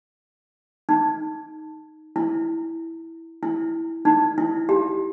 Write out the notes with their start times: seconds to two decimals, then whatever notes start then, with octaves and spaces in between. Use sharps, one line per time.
0.89 D#4
2.16 E4
3.43 E4
4.05 D#4
4.38 E4
4.69 G4